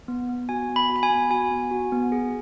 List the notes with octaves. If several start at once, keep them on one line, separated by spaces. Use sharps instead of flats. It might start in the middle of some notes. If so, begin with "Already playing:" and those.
B3
B3
F#4 G#5
B3
B5
F#4
B5
G#5
B3
F#4 G#5
B3
F#4
B3
G#4